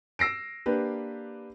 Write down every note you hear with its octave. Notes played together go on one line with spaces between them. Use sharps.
E6 A#6 C7 D7
A#3 D4 G4 B4